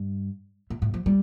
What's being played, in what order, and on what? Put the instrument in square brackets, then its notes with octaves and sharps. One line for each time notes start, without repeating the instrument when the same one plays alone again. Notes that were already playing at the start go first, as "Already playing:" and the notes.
Already playing: [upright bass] G2
A2
A2
F3
G3